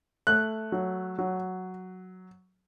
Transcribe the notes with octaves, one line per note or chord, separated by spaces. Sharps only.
A3 F#6
F#3
F#3